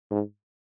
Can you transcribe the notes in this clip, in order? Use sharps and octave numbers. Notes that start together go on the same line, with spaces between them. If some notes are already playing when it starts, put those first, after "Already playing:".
G#2